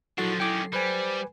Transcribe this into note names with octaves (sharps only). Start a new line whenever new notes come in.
F3 F#3 D4 E4 F#4 A4 C7
D#3 C#4 E4 G5 D6
G3 B4 C5 G#5